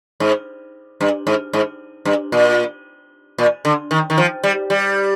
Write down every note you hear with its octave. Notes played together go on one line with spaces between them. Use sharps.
G#2
G2
G#2
G#2
G2
A#2
A#2
D3
D#3
D#3
F3
G3
G3